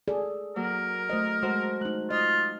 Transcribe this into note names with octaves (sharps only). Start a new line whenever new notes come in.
G#4 A4 D5
F#3 A#3 A#4
A3 C5 D#5
G#3 F#4 A4 C5
A3 D#4 F#6
F4 D#5